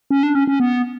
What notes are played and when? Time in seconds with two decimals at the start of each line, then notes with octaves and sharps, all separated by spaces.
0.11 C#4
0.23 D4
0.35 C#4
0.47 C#4
0.60 B3